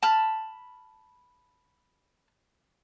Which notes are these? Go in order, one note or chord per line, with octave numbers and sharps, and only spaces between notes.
A5 B5 F6